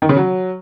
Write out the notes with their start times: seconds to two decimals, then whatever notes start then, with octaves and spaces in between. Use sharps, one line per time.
0.02 D#3
0.09 C#3
0.17 F#3